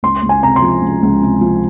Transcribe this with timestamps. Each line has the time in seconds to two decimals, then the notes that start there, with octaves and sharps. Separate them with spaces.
0.03 C#2 C6
0.23 C#2
0.29 G#5
0.43 C3 A#5
0.56 C6
0.62 F3
0.82 C#2
1.02 C#2
1.22 C3
1.41 F3